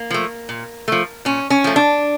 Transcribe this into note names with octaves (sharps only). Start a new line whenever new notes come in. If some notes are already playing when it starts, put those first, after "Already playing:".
Already playing: A#3
F3 A3
A#2
F3 A3
A#2 C#4
C#4
F3 A3
D4